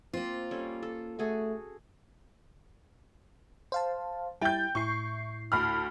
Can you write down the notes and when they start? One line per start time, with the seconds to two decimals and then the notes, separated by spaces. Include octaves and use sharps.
0.13 A#3 C4 F4
0.51 G3 C#4 A4
0.83 A4
1.19 A3 F#4 G#4 A4
3.72 C5 F5 A5
4.41 G3 E4 G5 G6 A6
4.75 A2 E4 C#6 C7
5.52 D2 B5 F6